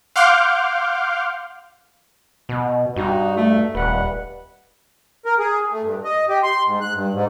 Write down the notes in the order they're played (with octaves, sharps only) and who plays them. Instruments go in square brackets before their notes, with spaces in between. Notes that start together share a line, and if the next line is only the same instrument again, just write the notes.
[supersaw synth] F5 F#5 C6 D6 F6 G6
[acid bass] B2
[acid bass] G2 [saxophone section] D#4 F#4
[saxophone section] A3
[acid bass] D#1 [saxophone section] G3 B4 F#5
[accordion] A#4
G#4
A3
G2
D#5
G4
C6
G#2
F#6
G2
G#2